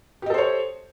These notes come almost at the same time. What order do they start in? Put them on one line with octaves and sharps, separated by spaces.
G4 D#5 A4 C5 C#5